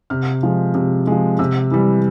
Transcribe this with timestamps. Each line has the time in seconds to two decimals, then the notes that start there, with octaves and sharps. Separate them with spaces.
0.10 C3 F6
0.43 F3 G#3
0.75 C3
1.07 F3 G#3
1.39 C3 E6
1.71 E3 G3